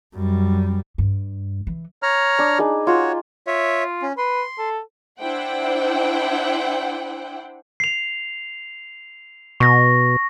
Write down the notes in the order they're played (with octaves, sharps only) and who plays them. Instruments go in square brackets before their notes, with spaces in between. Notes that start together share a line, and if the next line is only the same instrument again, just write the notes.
[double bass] F#2 G3
[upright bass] G2
E3
[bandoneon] C#5 A#5 F6
[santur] D4
D#4 G#4 B4
[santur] F4 [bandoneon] F#4 C#5
[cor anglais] F4 [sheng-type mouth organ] C#5 E5
[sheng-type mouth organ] C#4
[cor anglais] B4 [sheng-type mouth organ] C6
[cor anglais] A4
[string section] D4 E4 C5 F#5 G5
[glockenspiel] C7 F7
[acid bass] B2 [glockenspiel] C#6 A#6